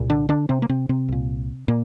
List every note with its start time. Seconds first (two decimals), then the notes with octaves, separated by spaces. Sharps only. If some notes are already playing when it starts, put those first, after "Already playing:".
Already playing: C2 A#2
0.10 D3 D4
0.29 D3 D4
0.49 C3 C4
0.62 A#3
0.69 C3 C4
0.89 C3 C4
1.08 C2 A#2
1.68 A#2 A#3